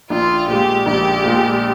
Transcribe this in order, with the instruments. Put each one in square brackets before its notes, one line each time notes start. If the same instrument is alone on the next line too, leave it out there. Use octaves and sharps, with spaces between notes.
[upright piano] A#1 [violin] F4
[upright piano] A#2 G#3 [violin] G4
[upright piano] A#1 [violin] G4
[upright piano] A#2 G#3